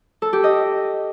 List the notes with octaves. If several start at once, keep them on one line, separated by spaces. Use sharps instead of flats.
A4
G4
D#5